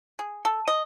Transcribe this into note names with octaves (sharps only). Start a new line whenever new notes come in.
G#4
A4
D#5